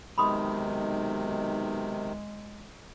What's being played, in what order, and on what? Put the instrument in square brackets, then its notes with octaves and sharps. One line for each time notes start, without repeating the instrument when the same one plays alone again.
[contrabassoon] B1 [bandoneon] C3 D#3 [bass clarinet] G#3 [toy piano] B5 C6 D#6